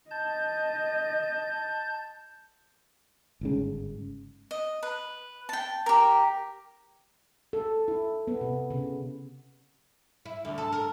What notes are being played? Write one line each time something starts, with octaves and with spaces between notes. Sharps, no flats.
D#5 A5 G6
G1 G#2 C#3
D#5
B4
G5 A5
G4 A#4
A4
E4
B3
C3
C#3
E4
D2
A4
A#4